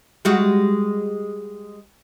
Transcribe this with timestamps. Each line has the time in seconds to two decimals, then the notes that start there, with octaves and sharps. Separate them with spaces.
0.25 G3 G#3 F#4